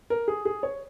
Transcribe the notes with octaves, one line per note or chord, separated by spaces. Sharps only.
A#4
G#4
G#4
C#5